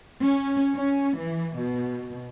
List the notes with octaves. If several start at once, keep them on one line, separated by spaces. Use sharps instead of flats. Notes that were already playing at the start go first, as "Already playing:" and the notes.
C#4
C#4
E3
B2